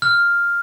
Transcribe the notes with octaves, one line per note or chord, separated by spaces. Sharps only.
F6